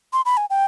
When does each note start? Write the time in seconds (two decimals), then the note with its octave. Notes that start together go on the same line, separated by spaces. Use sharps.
0.13 C6
0.26 B5
0.37 G#5
0.50 G5